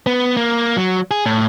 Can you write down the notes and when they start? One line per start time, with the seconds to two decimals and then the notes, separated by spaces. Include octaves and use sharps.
0.06 B3
0.37 A#3
0.77 F#3
1.11 G#4
1.26 A2